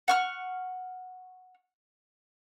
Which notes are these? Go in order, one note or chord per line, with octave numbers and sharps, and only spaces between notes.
F#5 C#6 F6